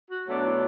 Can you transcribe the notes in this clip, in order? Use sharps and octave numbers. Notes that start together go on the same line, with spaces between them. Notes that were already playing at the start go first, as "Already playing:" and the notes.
F#4
B2 F#3 A3 D4
E4